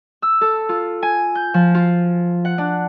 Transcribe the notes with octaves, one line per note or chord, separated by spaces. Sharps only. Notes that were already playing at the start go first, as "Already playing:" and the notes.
E6
A4
F4
G#5
G6
F3
F4
F#5
D4